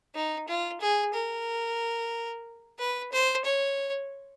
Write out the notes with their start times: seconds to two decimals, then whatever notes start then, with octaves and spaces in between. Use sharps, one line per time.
0.15 D#4
0.48 F4
0.81 G#4
1.14 A#4
2.79 B4
3.12 C5
3.45 C#5